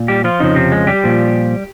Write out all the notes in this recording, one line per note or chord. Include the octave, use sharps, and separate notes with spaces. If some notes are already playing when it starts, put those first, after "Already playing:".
Already playing: A#2
G3 G4
F3 F4
F2 C#3 F3 D#4
C3 C4
G#3
G3 G4
A#2 F3